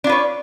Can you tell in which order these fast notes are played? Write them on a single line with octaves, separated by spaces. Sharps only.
D4 F4 B4 C#5